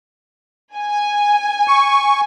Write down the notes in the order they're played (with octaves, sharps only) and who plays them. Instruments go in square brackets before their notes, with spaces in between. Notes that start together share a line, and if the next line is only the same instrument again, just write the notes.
[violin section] G#5
[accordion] C#6